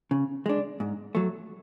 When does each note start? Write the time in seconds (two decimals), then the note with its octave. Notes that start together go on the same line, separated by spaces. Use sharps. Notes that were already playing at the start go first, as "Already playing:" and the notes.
0.11 C#3
0.46 G#3 D4
0.80 G#2
1.15 F#3 A3